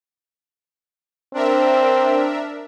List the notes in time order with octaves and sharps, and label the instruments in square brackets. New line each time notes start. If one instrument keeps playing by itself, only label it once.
[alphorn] C4 [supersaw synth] D4 A#4 E5